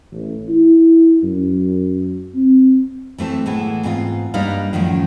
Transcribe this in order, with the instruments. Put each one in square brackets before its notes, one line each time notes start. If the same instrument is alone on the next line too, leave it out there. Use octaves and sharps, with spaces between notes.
[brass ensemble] A1
E4
F#2
C4
[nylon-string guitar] E3 A3 C4 A4
A2 E3 G#3 B3
G#2 B3 C4 E4 F4
G2 G3 A#3 D#4 B4 F5
F#2 A2 D#3 F3